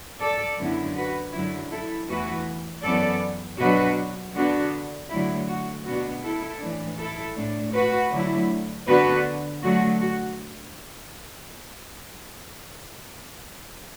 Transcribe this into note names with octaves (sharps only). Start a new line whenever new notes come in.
A4 D5
F#2 D3 B3 E4
F#4 B4
F#2 D3 F#3 E4
E4 A4
E2 E3 A3 E4 F#4 B4
F#2 E3 B3 A4 D5
B2 F#3 D4 F#4 B4
D3 B3 D4 F#4
D3 F#3 A3 E4
F#4
B2 B3 D4 F#4
E4 A4
A2 E3 D4
E4 A4
A2 A3 D4
F#4 B4
D3 F#3 A3 E4
D3 B3 D4 F#4 B4
D3 F#3 A3 F#4
F#4